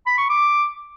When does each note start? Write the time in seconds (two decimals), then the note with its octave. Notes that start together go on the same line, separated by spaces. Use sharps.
0.07 B5
0.18 C#6
0.30 D6